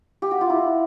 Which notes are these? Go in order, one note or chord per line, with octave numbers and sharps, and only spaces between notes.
G4
F#4
F4
E4